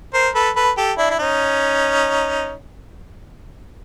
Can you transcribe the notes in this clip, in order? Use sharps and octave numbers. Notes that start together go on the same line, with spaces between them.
A#4 C5
A4 B4
A4 B4
G4 A4
D4 E4
E4
C#4 D#4